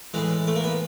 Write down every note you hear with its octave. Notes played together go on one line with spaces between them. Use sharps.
A2 E3 G#3
A3
A#3
B3